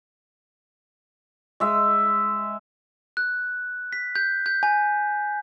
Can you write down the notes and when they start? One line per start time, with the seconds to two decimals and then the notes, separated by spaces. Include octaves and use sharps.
1.60 G#3 E5
3.17 F#6
3.93 B6
4.16 G6
4.46 G6
4.63 G#5